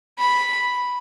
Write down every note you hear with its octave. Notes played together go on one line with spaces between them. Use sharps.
B5